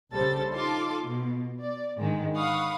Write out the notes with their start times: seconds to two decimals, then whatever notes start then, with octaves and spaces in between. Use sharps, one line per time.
0.12 A#1 C#3 G3 A4 C5 A6
0.53 D#4 F4 A4 C6 D6
1.02 B2
1.61 D5
1.98 G#2 D3 D#3 G#3
2.35 F5 F#5 B5 C#6 D#6